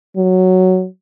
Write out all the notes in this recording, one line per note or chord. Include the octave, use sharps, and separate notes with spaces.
F#3